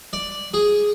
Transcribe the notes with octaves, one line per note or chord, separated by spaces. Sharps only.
D5
G#4